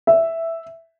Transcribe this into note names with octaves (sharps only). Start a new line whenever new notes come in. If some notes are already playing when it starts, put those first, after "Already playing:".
E5